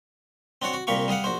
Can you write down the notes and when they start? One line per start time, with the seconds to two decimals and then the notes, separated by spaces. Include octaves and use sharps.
0.62 C4 D4 F#4 C#5
0.73 F#4
0.87 C2 A#2 G4 F5 C#6
1.08 G3 G#4 F5 F#5
1.24 A#1 F#4 C5